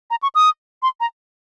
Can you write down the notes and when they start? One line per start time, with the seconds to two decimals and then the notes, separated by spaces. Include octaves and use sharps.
0.11 A#5
0.23 C#6
0.35 D#6
0.83 C6
1.00 A#5